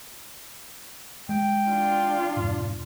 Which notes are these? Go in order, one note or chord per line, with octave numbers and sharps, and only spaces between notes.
G#3 G5
D4 F4
F2 G#2 B2